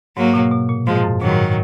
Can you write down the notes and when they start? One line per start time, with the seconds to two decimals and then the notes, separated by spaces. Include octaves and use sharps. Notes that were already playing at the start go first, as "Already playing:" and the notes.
0.17 G#2 F#3 A#3
0.34 B2
0.51 B2
0.69 A#2
0.87 G#2 F3 G#3
1.04 F#2
1.21 A#2 D#3 F#3
1.31 G#2